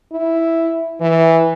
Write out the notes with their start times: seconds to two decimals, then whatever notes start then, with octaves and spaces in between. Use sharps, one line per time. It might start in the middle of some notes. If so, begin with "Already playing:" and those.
0.12 E4
1.01 E3